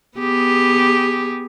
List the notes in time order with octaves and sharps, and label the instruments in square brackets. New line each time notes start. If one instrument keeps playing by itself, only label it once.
[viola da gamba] B3 G4 G#4